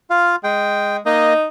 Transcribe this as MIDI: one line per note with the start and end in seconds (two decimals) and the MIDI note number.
0.10 0.36 65
0.10 0.36 77
0.44 0.98 56
0.44 0.97 79
1.06 1.33 58
1.06 1.46 63
1.06 1.33 75